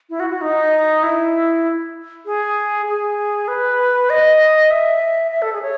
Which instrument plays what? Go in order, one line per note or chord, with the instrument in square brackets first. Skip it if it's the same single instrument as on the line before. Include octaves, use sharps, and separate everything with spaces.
[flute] E4
F#4
F#4
D#4
E4
G#4
G#4
B4
D#5
E5
E5
A4
G#4
C#5